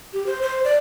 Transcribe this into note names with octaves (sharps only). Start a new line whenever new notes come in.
G4
C5
C5
D5